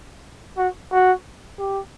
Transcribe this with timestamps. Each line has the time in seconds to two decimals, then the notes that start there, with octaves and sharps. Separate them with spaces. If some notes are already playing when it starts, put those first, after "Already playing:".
0.57 F#4
0.92 F#4
1.59 G4